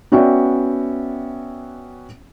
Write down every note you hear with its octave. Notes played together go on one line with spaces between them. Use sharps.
B3 C#4 F#4 D5 E5 G5